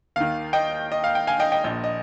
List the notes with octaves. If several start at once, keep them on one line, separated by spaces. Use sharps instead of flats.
D#2 D#3 F5
D#5 G5
D#5
F5
G5
F5 G#5
D#5 G5
D#5 G5
A#1 A#2 D#5
D#5